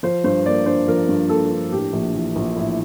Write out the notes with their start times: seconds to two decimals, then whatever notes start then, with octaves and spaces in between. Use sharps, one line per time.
0.03 F3 C5
0.24 G2 C5
0.46 A#3 D5
0.66 D4 C5
0.88 F3 A#4
1.09 G2
1.29 A#3 A4
1.51 D4
1.72 A2 G4
1.93 A#1
2.14 E3
2.36 A#1
2.56 A2 E4